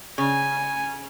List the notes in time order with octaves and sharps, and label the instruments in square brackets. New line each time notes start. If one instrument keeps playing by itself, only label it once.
[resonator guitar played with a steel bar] C#3 [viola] G#5